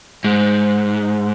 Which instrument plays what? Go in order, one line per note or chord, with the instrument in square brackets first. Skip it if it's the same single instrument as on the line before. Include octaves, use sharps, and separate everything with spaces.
[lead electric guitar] G#2